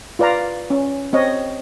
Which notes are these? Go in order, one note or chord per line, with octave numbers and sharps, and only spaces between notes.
F4 B4 D5 F5 A#5
C#4
C4 C#5 D#5